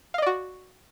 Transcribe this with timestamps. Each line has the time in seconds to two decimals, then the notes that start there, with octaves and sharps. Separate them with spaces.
0.14 F5
0.18 D#5
0.22 D5
0.26 F#4